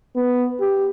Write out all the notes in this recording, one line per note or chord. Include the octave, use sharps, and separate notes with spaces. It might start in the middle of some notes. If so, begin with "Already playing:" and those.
B3
G4